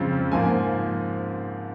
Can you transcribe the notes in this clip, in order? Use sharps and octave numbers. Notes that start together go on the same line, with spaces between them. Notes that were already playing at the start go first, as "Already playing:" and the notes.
Already playing: F2 C#3 F3 G#3 C4
G#2 F3 A#3 G#5